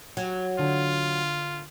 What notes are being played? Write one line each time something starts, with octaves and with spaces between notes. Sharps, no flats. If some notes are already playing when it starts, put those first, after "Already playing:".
F#3
D3 F4